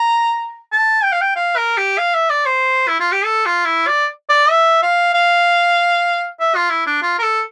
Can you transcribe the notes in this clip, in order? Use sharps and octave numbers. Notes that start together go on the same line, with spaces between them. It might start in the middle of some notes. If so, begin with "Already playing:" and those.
Already playing: A#5
A5
G5
F5
G5
F5
A#4
G4
F5
E5
D5
C5
E4
F4
G4
A4
F4
E4
D5
D5
E5
F5
F5
E5
F4
E4
D4
F4
A#4
A4